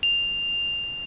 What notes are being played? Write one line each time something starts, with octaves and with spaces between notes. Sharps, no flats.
F7